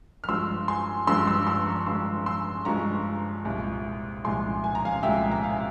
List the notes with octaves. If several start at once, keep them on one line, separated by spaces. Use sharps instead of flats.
F6
G2 F3 G#3 C6 E6
G#5 C6
G2 F3 G#3 C6 E6
C6 E6
C6 E6
A#5 C#6
G2 F3 G#3 C6 E6
C6 E6
G2 F3 G#3 A#5 C#6
C2 A#2 G#3
C2 A#2 G#3 G#5 C6
G#5
A#5
F5 G#5
C2 A#2 G#3 E5 G5
A#5
F5 G#5